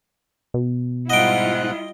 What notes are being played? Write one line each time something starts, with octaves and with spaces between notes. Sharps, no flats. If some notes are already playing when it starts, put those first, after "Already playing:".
B2
G#2 G3 E4 F4 D#5 F#5 G5